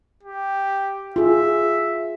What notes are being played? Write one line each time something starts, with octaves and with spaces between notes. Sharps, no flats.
G4
F4 G#4 E5